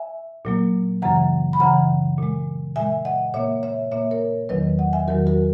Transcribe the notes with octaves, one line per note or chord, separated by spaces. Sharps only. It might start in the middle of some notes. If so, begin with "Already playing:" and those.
Already playing: E5 G#5
A#2 F#3 A#3
F#2 C#3 E3 F#5 A#5
B5
F#2 C#3 E3 F#5 A#5
A#2 G#3
A#2 G#3 E5 G#5
D#5 F#5
A#2 A#3 C#5 E5
C#5 E5
A#2 A#3 C#5 E5
A#4 C#5
E2 D#3 F#3 B4 D#5
D#5 F#5
E5 G#5
E2 D#3 F#3 F#4 A#4
F#4 A#4